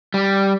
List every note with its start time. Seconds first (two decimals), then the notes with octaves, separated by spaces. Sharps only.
0.14 G3